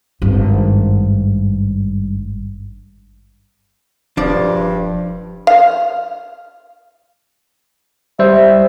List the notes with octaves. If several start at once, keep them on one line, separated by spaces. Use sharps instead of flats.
G#1 G2
E1 G2 F3 D4 D5
F5
G3 C5 E5